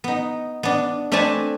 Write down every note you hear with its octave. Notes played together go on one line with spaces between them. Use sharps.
B3 D#4
B3 D4
A3 C4 D4 B4 G#5 A5